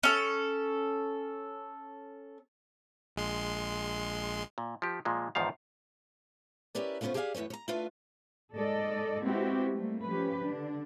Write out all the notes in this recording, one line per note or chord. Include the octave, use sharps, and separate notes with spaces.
C#4 A4
A#1 G#3 C6
A#2
F3 G4
A#2 F3 G#3
E2 G#2 D#3 F3 F5
C#4 E4 G4 A#4 B4 D5
C#3 A3 B3 C#4 F4 C5
G4 G#4 D5 D#5 F5 G#5
F#2 E3 A3 B4 C#5
C#5 A#5
A3 D4 E4 F4 B4 F5
G#2 G#3 A4 D5 D#5
G#3 B3 C4 E4 F#4 G4
G3 A3 A#3
F3 C#4 G4 B4
D3 D4